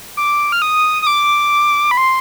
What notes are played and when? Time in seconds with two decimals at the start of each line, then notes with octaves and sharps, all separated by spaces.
0.17 D6
0.52 F6
0.62 D#6
1.02 D#6
1.07 D6
1.91 B5
1.97 C6